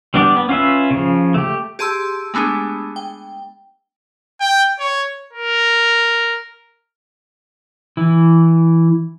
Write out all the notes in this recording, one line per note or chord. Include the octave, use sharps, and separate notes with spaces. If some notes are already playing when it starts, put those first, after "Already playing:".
G3 B3 D4 G4 D5
B3
C#4 F4 B4 E5
C#3 F3
A3 G4
G4 G#4 A5 C6 E6
G#3 A3 B3 D4 G#4
G5
G5
C#5
A#4
E3